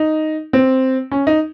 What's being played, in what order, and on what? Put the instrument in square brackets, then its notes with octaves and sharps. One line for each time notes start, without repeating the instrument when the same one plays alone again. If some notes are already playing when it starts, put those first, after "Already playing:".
Already playing: [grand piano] D#4
C4
C#4
D#4